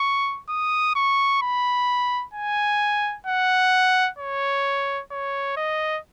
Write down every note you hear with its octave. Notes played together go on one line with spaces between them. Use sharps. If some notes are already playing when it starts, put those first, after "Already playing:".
Already playing: C#6
D#6
C#6
B5
G#5
F#5
C#5
C#5
D#5